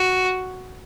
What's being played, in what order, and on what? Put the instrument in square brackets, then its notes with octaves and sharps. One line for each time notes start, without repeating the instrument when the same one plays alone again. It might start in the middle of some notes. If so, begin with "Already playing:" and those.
Already playing: [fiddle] F#4